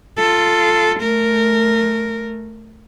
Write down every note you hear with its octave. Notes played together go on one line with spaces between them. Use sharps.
F4 A4
A3 A#4